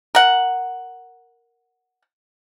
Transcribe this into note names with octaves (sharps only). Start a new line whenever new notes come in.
A#4 F#5